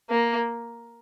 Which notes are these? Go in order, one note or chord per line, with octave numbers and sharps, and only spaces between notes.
A#3